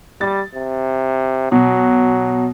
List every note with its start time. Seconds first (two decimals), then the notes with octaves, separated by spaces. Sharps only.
0.21 G3 A6
0.54 C3
1.52 B2 F#3